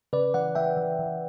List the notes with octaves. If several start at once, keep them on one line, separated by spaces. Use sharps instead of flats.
C#3 B4 D5
E3 D5 F#5
E3 E5 G5
E3
E3